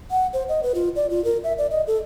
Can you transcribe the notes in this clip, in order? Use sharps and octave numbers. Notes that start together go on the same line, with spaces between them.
F#5
C5
D#5
B4
F4
D5
F4
A#4
E5
D5
D#5
A4